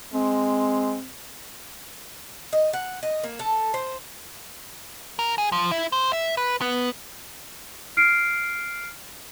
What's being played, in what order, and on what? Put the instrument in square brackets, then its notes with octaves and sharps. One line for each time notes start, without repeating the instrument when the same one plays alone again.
[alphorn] G#3 [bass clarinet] C4
[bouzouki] D#5
F#5
D#5
A#3
A4
C5
[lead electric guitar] A#4
G#4
F3
E4
C5
E5
B4
B3
[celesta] F6 C7 D7